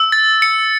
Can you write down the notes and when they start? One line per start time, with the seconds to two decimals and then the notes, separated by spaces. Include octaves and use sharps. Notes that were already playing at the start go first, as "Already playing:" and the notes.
Already playing: E6
0.12 A6
0.42 C#7